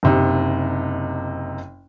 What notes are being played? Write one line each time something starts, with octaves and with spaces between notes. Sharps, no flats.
F#1 C3 D#4